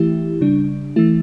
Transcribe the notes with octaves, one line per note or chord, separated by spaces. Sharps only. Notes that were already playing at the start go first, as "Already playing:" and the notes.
Already playing: E3 A3 E4 G4
C#3 G3 D4
E3 A3 E4